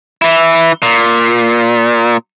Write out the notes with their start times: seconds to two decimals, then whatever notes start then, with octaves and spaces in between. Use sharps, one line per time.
0.22 E3 E4
0.82 A#2